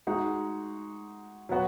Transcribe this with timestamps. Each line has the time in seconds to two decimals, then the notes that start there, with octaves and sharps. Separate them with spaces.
0.07 G#3 D#4 F#4
1.49 F#3 B3 F#4